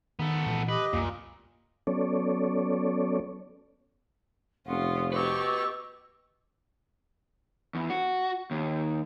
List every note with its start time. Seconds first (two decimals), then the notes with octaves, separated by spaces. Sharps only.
0.19 D#3 B3 A4
0.46 A#2 E3
0.69 G4 B4 D#5
0.93 C2 F#2 A#2
1.87 F#3 B3 C#4 A4 C#5 D5
4.67 F1 C#4 F4 F#5 C6 D#6
5.13 G4 B4 D#5 C#6 D6 E6
7.75 E2
7.90 F#4
8.51 D#2